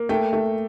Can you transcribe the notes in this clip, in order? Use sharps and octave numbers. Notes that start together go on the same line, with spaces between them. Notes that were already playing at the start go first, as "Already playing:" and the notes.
Already playing: A#3
A3 G5
A3